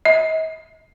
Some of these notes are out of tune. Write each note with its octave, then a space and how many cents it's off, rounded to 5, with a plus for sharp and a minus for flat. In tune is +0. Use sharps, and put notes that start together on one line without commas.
D#5 +45